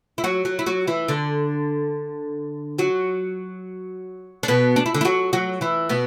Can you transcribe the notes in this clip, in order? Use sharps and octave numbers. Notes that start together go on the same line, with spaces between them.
E4
F#3 F#4
F#3 F#4
E4
F#3 F#4
E3 E4
D3 D4
F#3 F#4
D4
B2 B3
D4
E4
D3 D4
E4
F#3 F#4
F#3 F#4
E3 E4
B2 B3